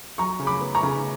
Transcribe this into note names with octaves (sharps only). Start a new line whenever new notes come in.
F#3 A#5 C#6
C#3
B5 D6
B3
A#5 C#6
C#3